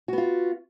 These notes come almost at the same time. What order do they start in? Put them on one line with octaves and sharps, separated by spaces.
F#4 B3 F4